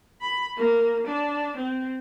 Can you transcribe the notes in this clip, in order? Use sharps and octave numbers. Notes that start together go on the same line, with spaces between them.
B5
A#3
D4
C4